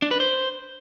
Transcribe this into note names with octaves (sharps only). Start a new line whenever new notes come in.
D4
B4
C5